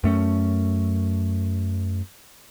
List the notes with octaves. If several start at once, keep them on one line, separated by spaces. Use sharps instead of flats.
F#2 A3 C#4